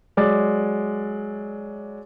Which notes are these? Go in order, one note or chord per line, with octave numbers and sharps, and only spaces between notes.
F#3 G#3 D5 D6 A6